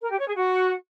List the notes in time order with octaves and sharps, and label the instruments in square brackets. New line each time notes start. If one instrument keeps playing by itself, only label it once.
[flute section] A#4
G4
C#5
G#4
F#4